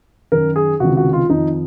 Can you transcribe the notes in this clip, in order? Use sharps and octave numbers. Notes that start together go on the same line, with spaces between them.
F#2 D#3 A#4
G#4
C#2 C3 D#3 F#4
F#4
F4
F2 D#3 D#4